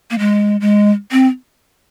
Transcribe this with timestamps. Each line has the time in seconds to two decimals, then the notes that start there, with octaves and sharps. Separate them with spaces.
0.11 A#3
0.19 G#3
0.61 G#3
1.12 C4